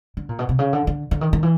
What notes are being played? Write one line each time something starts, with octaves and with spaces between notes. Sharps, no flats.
D3
A#2
B2
C3
C#3
D3
D3
D3
D#3
D#3
E3